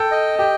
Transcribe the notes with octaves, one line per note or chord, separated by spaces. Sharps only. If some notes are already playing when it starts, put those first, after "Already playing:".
Already playing: A4 G5
D#5
G4 G5